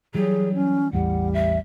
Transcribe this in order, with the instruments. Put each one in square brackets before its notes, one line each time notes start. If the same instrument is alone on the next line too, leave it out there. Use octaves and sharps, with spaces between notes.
[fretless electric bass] E3 G3 [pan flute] F#3 [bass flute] G#4
[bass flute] C#4
[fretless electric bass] A1 E2 [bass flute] G3 [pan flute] F#5
[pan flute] E5